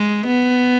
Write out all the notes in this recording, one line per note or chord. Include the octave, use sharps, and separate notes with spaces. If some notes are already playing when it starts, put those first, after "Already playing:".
Already playing: G#3
B3